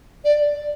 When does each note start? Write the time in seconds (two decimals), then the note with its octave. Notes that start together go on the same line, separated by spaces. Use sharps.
0.25 D5